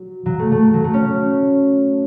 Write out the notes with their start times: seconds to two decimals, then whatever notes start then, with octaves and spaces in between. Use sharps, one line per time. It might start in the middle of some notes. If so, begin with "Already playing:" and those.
Already playing: F#3
0.26 F#3
0.39 A3
0.52 A3
0.74 F#3
0.84 A3
0.94 C#4